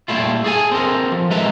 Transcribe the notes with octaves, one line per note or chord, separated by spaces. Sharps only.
A#2 G3 A3 E4 F4
G#4 A4 D#5 G#5
C4 A4 A#4
F3
G#3 A4 B4 E5 A#5